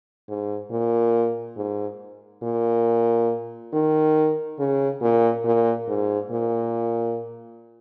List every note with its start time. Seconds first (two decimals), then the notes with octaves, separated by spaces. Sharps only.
0.29 G#2
0.71 A#2
1.57 G#2
2.43 A#2
3.73 D#3
4.59 C#3
5.02 A#2
5.45 A#2
5.88 G#2
6.32 A#2